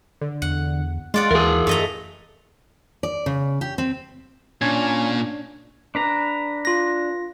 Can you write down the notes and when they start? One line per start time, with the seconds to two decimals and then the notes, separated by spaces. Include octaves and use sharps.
0.21 D3
0.42 E2 F#5
1.14 G#3 F4 D5 F#5
1.31 D#2 E3 G#4 A#4
1.67 F#2 A3 D#5 A#5
3.03 D5
3.26 C#3
3.61 G4
3.78 C4
4.62 A#2 C#4 D4 G#6
5.95 D4 B4 A#5
6.65 F4 A#6